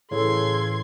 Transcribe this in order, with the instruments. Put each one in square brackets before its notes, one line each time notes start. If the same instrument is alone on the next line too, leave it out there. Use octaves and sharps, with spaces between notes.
[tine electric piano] A2 E3 [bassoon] C#3 [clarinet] A4 [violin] C6 G#6